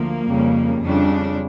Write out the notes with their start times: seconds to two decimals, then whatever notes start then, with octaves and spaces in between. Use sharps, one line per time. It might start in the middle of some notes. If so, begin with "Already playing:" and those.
Already playing: D2 F3 A#3
0.27 F2 C#3 G3
0.82 F2 C#3 G3 D4